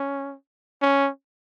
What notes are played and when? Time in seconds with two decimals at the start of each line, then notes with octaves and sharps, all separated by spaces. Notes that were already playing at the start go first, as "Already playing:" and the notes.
Already playing: C#4
0.82 C#4